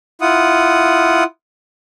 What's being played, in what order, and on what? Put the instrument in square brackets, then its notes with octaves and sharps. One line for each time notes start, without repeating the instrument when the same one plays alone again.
[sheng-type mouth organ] E4 F4 F#5 D#6